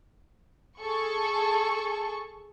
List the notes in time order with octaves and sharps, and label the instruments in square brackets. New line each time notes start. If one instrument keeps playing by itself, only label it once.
[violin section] G#4 A4 C#6